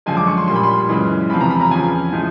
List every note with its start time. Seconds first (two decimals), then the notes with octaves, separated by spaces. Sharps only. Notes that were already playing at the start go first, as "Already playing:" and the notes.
0.06 F#2 D3 F3 G#3 G#5
0.17 D6
0.27 C#6
0.37 C6
0.48 A#2 G3 C6
0.56 B5
0.63 C6
0.89 F#2 C#3 E3 G#3
1.30 E2 C3 F3 B5
1.41 A#5
1.50 B5
1.61 A#5
1.71 E2 C#3 F3 G#5
2.12 A2 F3 G#3